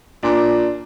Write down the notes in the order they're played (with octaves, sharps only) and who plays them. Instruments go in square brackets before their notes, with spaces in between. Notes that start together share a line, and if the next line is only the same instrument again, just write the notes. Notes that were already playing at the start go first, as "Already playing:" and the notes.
[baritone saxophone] A#2 [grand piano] D4